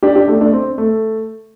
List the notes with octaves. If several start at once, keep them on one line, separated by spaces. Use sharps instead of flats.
D4 G4
D4 G4
A3 D4
A3 D4
C4
A3